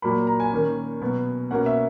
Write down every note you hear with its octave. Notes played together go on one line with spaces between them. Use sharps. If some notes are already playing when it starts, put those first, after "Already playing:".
A#2 F#3 A#3 B5
A#5
G#5
D#3 A#3 C#4
B2 F#3 B3
B2 A#3 C#4 F#5
E5